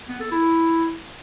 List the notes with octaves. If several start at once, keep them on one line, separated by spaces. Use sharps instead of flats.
B3
A4
E4